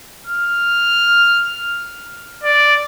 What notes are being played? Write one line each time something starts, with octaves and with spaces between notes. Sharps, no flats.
F6
D5